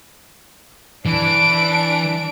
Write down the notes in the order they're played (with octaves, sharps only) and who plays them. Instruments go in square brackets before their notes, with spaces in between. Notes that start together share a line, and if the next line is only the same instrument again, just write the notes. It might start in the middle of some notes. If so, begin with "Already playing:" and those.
[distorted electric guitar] E3 [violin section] D4 D7